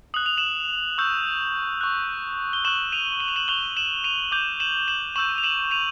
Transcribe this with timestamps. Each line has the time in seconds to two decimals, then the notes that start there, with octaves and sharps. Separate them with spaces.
0.14 D#6 F#6 F#7
0.26 F7
0.37 E7 F#7
0.98 C#6 E6 G6
1.81 C#6 F#6
2.53 G7
2.64 C#6 F#6 E7 F#7
2.92 D#7 F7
3.20 F#7
3.28 F7
3.36 E7 F#7
3.48 C#6 F#6 F7 G7
3.77 E7 F#7
4.04 D#7 F7
4.32 D6 G6 D#7 F7
4.60 E7 F#7
4.88 E7 F#7
5.16 C#6 E6 G6 E7 F#7
5.38 F7
5.44 E7 F#7
5.71 D#7 F7